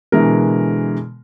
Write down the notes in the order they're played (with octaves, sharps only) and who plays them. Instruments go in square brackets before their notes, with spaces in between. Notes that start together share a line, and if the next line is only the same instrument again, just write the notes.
[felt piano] B2 D3 E3 G#3 A#4